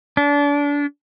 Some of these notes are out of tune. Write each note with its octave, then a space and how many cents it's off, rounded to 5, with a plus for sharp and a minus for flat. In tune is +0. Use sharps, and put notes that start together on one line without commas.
D4 -30